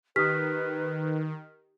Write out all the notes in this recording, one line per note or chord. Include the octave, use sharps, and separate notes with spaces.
D#3 G4 B4 D#6 F6 B6